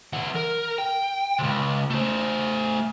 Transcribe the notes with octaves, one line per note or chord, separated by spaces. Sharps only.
E3 F#5
A#4
G5
C#2 C3
A3 C5